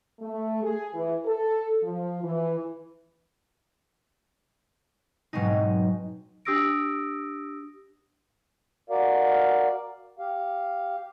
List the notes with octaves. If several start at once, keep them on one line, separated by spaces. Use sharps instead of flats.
A3
G#4
E3
A4
F3
E3
G#2 B2 F#3 G#3 C4 D#4
D4 G4 D#6 E6 A#6 D7
F#4 A#4 D5 F5
G4 F5